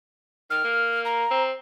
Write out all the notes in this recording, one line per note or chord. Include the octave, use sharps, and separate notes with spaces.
D#3 F6
A#3
A#5
C4